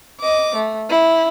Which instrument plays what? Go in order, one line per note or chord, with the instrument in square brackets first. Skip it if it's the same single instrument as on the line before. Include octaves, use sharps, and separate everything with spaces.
[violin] D#5 D6
A3
E4